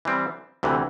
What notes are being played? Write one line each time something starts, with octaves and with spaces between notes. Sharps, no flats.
E3 G3 C4
D2 C3 E3